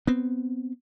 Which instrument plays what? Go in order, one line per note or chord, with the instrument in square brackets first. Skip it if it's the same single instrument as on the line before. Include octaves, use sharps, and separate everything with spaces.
[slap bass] B3 C4